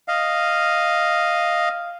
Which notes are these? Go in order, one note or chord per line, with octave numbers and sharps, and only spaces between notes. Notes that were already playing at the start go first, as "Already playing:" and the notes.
D#5 F5